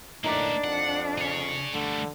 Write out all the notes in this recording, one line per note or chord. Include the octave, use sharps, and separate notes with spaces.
A2 A#3 D4 D#4 A#4 B4 D5
F2 F#5
G#4 C#5
D3 G3 A3